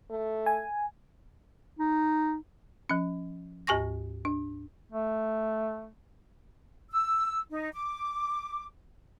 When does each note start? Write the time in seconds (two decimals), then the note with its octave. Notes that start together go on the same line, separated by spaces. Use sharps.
0.10 A3
0.46 G#5
1.79 D#4
2.89 F3 C#4
3.67 D2 G#2 G4 G#5 C#6 A#6
4.25 D4
4.92 A3
6.91 E6
7.51 D#4
7.73 D6